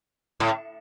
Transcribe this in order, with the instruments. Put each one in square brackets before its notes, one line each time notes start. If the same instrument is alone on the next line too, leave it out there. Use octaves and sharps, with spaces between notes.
[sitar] A2